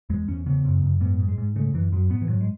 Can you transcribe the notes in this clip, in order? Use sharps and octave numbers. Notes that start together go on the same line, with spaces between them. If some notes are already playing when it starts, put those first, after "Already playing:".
E2 G#3
E2 C#4
C#3 B3
F#2
F#2
G#2 B3
G#2
G#3
G#2
C#3 A3
F#2 E3
F#2 F#3
G#2 B3
E3
G#2 F#3
G#3